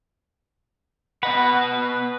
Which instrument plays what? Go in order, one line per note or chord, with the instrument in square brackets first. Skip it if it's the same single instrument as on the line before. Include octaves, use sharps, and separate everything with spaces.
[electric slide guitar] B3 D#5 F#5 [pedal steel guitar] B4